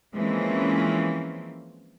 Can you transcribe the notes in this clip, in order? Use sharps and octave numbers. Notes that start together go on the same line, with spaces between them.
E3 F3 G#3 A#3 C4 C#4